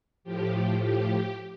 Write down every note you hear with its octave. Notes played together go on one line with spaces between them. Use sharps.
A2 F3 G4
G4